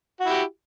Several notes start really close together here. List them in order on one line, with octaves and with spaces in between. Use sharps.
F#4 E4 G4